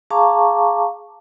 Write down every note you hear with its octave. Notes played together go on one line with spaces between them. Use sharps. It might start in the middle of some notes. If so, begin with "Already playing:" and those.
G#4 F5 A5 A#5 C#6 D6